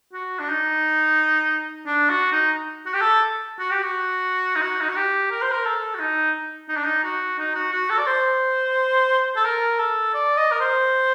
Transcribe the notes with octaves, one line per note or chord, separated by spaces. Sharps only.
F#4
D4
D#4
D4
F#4
D#4
F#4
G4
A4
F#4
G4
F#4
D#4
F#4
D#4
F#4
G4
A#4
C5
A#4
A4
F#4
D#4
D#4
D4
D#4
F#4
D#4
F#4
F#4
A4
D5
C5
A4
A#4
A4
D5
D#5
A#4
C5